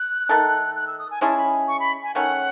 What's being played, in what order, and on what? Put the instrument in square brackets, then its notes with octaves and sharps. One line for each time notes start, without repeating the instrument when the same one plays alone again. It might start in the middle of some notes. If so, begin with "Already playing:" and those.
Already playing: [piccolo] F#6
[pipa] D#3 A3 D#4 A4
[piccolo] F#6
E6
D#6
G#5
[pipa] G#3 C#4 E4 G#4 [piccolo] A5
[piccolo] B5
C#6
B5
G#5
[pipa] D#3 A3 C#4 [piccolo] F#5